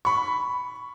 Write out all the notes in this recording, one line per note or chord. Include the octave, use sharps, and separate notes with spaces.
B5 C#6